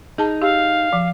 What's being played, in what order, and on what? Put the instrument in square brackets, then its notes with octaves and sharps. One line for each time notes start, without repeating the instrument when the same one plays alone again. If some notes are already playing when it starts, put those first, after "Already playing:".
[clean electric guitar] D#4 [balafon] G#4 A5
[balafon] G4 [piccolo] F5
[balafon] F3